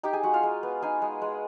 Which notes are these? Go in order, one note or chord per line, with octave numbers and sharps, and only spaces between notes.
D#4 G4 G5
G#4 G#5
G#3 F#4 F#5
F4 F5
G#3
B3
D#4 G#4 G#5
G#3
G#3